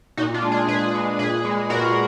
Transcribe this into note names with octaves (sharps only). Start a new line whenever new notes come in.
A#2 D#4 F#4
D4 F4
G#3
F4 G#4
A#2 G#4 B4
G#3
A#2 G#4 B4
G#3
A#2 F#4 A#4